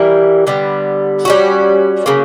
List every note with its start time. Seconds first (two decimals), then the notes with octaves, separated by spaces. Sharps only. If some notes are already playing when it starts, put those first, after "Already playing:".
Already playing: E3 G3 A#3
0.47 D3 G3 B3
1.25 G3 C#4 F#4
2.06 C#3 F#3 A#3